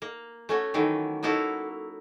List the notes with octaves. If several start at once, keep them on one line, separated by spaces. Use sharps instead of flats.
A#3
A3 C#4 F#4
D#3 E3 F#3 A3
F#3 A#3 D#4 E4 F#4 A4